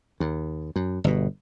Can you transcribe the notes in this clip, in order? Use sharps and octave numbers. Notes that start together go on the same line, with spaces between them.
D#2
F#2
G1 B2